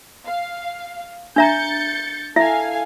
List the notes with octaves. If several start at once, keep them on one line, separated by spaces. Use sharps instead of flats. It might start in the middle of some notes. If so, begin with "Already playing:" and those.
F5
D4 E5 A#5 G6 A6 C#7
E4 A4 E5 F5 G#5